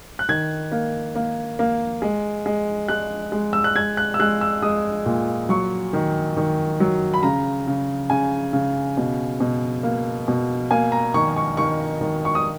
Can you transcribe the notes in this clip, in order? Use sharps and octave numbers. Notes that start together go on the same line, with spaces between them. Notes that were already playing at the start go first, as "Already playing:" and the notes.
F#6
D#3 G#6
A#3
A#3
A#3
G#3
G#3
G#3 F#6
G#3
E6
F#6
G#3 G#6
F#6
E6
G#3 F#6
E6
G#3 D#6
A#2
F#3 C#6
D#3
D#3
F#3
B5
C#3 A#5
C#3
C#3 G#5
C#3
B2
B2
A#3
B2
A#3 G#5
A#5
D#3 C#6
C#6
D#3 C#6
D#3
C#6
D#6